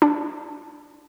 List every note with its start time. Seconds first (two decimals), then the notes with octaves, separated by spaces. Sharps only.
0.02 D4